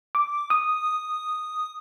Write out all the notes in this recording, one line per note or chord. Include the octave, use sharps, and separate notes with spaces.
D6
D#6